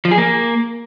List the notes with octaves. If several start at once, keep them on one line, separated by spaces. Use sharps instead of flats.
F3
G#4
A#3